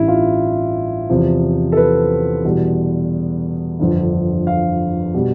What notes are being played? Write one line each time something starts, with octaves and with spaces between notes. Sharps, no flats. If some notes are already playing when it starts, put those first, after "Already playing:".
Already playing: A1 G2 E3 G3 E4
F4
E2 C3 F3
A4
B4
E2 B2 G3
G1 F2 D3
F5
B2 G3